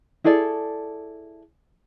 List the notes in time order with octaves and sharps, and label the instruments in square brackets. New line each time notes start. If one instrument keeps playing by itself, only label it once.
[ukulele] E4 G#4 A4 D5